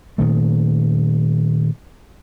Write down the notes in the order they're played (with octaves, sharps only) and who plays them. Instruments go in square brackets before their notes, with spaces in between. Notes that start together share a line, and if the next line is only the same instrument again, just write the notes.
[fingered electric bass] A#2 D#3 A3